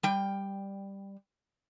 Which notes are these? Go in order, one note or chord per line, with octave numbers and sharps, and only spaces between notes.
G3 G5